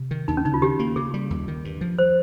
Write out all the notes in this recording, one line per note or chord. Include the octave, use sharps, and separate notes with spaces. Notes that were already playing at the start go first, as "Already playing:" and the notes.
Already playing: C3
D#3
D#2 D#4
C#4
C#3 D#4
F4
D#3 G4
A#3
C#3 G#4
G3
D#2
D#3
G2
F3
C5